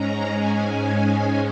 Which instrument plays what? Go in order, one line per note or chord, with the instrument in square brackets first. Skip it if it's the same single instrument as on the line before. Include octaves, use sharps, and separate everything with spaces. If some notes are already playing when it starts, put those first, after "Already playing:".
Already playing: [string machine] G#2 G#3 C#4 A#5
G#5